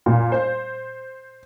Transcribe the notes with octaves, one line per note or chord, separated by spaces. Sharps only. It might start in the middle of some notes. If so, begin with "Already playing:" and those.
A#2
C5